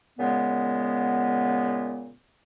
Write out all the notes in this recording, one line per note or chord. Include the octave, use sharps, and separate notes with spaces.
A#2 C#3 G#3 B3